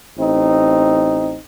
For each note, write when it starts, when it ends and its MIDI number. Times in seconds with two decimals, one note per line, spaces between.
0.18 1.37 33
0.18 1.37 60
0.18 1.37 63